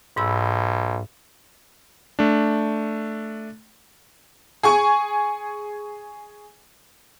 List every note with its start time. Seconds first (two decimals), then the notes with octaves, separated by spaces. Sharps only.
0.17 B1 G#2 B5 E6
2.19 A3 D4
4.63 G#4 G#5 C#6